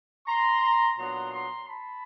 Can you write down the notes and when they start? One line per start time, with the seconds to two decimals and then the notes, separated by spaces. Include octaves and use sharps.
0.27 A#5 C6
0.97 A#2 F#3 B3 D4 A#5 C6
1.32 A#5 C6
1.68 A5 B5